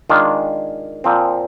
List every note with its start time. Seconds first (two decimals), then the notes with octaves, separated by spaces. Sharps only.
0.10 D#3 G#3 D4 F4
1.04 A#2 F3 C4